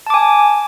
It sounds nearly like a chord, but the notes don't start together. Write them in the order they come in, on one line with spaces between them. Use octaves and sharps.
A5 D6 G#5